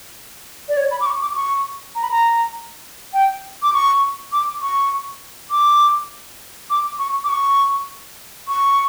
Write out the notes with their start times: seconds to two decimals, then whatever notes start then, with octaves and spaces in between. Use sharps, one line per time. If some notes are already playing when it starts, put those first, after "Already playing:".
0.69 D5
0.77 C#5
0.91 B5
1.01 D6
1.06 C#6
1.21 D6
1.36 C#6
1.95 A#5
2.03 B5
2.11 A#5
3.13 G5
3.62 D6
3.74 C#6
4.32 D6
4.62 C#6
5.51 D6
6.70 D6
6.99 C#6
7.24 D6
7.29 C#6
8.48 C#6